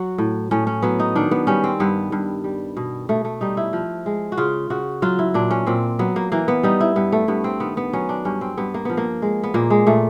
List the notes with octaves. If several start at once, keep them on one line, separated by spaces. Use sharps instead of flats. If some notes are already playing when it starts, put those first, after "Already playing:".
Already playing: F#3 F#4
A2
A2 C#4
C#4
F#3 B3
D#4
D#3 D4
B3
G3 C#4
C4
G2 B3
G2
G3
B2
B2 A3
A3
G3 D#4
E4
F3
G#3
F#4
C#3 F4
C#3 F#4
F#3 F4
E4
A#2 D4
C#4
A#2 C4
F#3 B3
A#3
E3 A#3
B3
G3 D#4
E4
G2 B3
A3
G2 B3
C4
D#3 B3
B3
F#3 C#4
D4
G2 C#4
C4
G2 B3
A#3
F3 B3
A#3
G#3
B3
A#2 A#3
G#3
A#2 A3